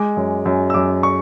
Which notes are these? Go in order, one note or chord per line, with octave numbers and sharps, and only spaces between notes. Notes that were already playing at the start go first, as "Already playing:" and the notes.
Already playing: G#3 D6
F#2
F#2
E6
F#2 D6
C#6